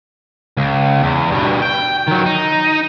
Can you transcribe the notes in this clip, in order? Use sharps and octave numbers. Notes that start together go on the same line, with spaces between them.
C#2
E2
G2 B2
G5
D#3 F#3
D#4